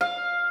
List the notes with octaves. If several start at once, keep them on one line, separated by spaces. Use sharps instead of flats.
F5